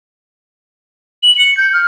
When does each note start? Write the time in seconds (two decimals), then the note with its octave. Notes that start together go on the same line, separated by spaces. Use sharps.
1.23 F#7
1.38 C#7
1.57 G6
1.73 F6